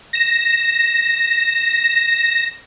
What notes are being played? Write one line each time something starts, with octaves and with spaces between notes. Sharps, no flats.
A#6 E7